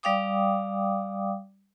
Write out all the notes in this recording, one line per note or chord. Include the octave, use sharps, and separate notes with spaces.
G3 D5 F5 G5 D6 D#6